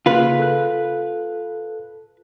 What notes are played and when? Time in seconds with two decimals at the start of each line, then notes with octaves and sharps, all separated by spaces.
0.06 C#3 A#3 F4 B4 F#6
0.39 A4 F#6